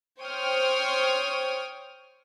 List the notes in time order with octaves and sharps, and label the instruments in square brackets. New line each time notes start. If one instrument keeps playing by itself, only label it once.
[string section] C5 C#5 G5 C#6 D#6 F6